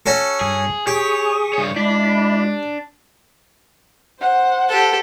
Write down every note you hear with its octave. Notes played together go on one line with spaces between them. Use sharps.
C#4 F#4 A4
G2 G#4
G4 G#4 C#5 C#6 D#6
G2 C#5
G#3 D4 E4 D5 B5
C5 F#5
G4 A4